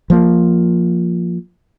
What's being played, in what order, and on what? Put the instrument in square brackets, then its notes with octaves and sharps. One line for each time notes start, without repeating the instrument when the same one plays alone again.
[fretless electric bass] F3 A#3